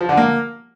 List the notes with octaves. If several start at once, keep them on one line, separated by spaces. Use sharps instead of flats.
F3
D3
A#3